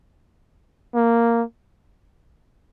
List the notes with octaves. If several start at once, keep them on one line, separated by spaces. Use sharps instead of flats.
A#3